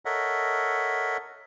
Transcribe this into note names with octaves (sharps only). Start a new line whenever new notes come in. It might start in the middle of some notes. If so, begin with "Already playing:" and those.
A4 A#4 C#5 D#5 E5 F#5